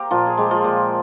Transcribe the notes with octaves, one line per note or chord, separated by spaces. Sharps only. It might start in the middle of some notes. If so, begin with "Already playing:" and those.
Already playing: A#3 G4 A#4 C5
A#2 F3 F4
G#4
G#3 G4
F3 F4
A#2